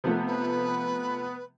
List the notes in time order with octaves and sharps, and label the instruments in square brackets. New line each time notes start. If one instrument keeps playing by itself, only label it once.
[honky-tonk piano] C3 F3 A3 [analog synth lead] B3
[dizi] B4